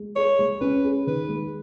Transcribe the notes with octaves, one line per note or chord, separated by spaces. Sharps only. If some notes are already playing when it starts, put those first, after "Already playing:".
Already playing: G#3
G#4 C#5
G#3
C#4 B4
G#4
D#3 B4
G#3